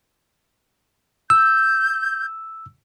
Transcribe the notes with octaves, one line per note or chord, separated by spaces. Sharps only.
E6 G6